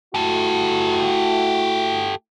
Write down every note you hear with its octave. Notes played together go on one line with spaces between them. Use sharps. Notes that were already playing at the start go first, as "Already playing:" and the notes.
A3 E4 F#4 G4 A4